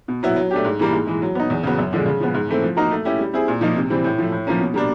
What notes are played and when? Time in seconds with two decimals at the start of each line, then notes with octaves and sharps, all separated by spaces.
0.08 B2
0.23 F#3 B3 E4
0.36 F#3
0.51 A3 D4 G4
0.65 G#2
0.79 E3 G3 A#3
0.93 G#2
1.07 E3 G#3
1.22 F#3
1.35 B3 D#4
1.50 E2
1.63 C#3 F#3 B3
1.78 F#2
1.93 D3 F3 G#3
2.06 C#3
2.20 F3 G#3 B3
2.34 G#2
2.48 E3 A3 C4
2.62 F3
2.76 A#3 D#4 F#4 A#4
2.91 A3
3.05 C#4 E4 G4
3.19 G3
3.33 C4 E4 G#4
3.48 A#2
3.61 F3 A#3 D#4
3.76 C3
3.90 E3 G3 C4
4.04 A2
4.18 F3 A3
4.32 A2
4.47 F3 A#3 C#4
4.60 B2
4.74 G3 A#3 D4